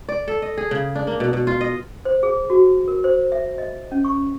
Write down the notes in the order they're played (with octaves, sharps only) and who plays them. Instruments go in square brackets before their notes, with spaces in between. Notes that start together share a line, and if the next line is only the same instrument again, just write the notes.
[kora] D5
A4
D#5
G#4
C#3
D4
A#3
B2
B2
F4
D#5
[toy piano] C5
G#4
F#4
A#4
C5
E5
D#5
C#4
C#6